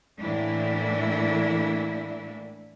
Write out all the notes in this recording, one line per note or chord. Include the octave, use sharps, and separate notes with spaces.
A2 E3 A3 A#3 D4 E4